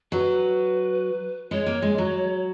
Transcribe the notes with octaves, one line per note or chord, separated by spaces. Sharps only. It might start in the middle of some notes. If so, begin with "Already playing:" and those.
F#3 B4
G#3 C#5
A#3
G#3
F#3